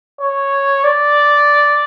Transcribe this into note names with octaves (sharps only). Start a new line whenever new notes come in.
C#5
D5